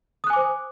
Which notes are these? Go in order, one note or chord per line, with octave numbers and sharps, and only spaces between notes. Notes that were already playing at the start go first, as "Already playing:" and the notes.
C5 G#5 D6 D#6 F#6